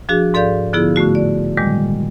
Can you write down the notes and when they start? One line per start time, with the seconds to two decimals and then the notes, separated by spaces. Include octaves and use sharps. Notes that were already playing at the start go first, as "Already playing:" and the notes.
0.09 F3 D4 F#4 G#4
0.34 G#2 A4 D5 F5 G6
0.73 D3 F3 B3 E4 F4 G#4
0.96 A2 D3 A3 F#4
1.15 D5
1.57 A#2 D#3 G3 G#3